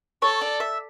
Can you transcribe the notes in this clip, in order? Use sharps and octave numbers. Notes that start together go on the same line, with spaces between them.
A4 C#5
D5
E5